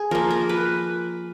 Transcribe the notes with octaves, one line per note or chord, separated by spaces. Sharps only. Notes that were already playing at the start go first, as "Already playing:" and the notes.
Already playing: G#4
F3 A#3 A#4
A#4
B4